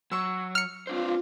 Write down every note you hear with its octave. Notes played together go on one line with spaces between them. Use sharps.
F#3 C#6 E6
F6 C#7
C4 D4 F4 C5